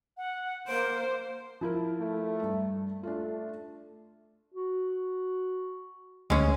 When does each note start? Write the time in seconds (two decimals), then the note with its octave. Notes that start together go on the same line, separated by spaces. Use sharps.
0.17 F#5
0.68 A#3 C5 D7
1.61 F3 E4 A#4
2.00 A3
2.43 G2
3.03 A3 D4 F4
4.54 F#4
6.30 D2 G#3 C#4